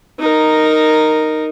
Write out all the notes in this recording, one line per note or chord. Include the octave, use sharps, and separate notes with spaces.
D#4 A#4